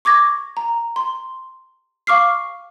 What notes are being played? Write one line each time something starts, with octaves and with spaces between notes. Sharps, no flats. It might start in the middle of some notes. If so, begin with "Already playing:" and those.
C#6 D6 G#6 A#6
A#5
C6
F5 C#6 D6 F6 C7